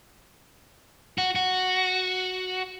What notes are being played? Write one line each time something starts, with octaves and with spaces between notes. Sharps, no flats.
F#4
F#4